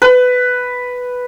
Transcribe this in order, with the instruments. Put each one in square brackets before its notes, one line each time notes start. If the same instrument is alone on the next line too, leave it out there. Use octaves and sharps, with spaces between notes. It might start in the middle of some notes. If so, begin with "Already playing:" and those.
[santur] B4